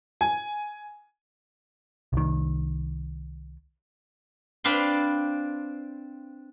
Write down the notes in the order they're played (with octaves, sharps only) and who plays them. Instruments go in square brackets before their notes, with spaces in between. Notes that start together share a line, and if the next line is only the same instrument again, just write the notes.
[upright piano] G#5
[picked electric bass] C2 D#3
[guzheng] C4 D4 B4 F5 C6